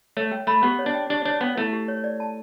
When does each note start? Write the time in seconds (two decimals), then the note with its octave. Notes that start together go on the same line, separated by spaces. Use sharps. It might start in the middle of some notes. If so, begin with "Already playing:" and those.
0.17 A3 C#5
0.32 G5
0.47 A3 B5
0.63 B3 G4
0.79 C#5
0.86 D4
0.94 G5
1.10 D4 G4
1.25 D4 C#5
1.41 B3 G5
1.57 A3 E4
1.73 G4
1.88 C#5
2.04 D5
2.20 A5